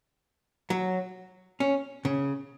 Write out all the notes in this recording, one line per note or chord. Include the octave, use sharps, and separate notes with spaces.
F#3
C#4
C#3